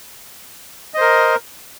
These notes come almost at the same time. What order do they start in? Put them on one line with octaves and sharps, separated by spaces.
D#5 C5 A#4